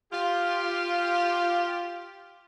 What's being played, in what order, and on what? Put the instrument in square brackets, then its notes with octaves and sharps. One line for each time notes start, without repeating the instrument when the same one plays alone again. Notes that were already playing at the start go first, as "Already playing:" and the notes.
[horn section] F4 G4